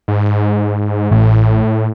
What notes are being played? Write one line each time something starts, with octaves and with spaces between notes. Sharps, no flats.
G#2
A1 A2